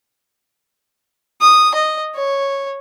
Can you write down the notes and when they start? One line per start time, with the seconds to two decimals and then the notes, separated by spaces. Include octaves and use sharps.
1.41 D#6
1.75 D#5
2.15 C#5